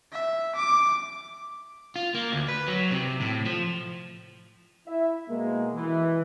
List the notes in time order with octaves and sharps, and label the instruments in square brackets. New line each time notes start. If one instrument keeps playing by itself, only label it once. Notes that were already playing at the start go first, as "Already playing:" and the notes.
[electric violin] E5
D6
[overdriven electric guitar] F4
A#3
D2
B4
F#3
C3
A2
F3
[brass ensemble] E4 E5
B2 G#3 A#3
E3